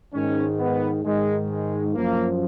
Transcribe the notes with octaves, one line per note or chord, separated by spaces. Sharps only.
G#2 D#3 C#4
B3
G#2 D#3 G#3
G#3
F#2 F3 A#3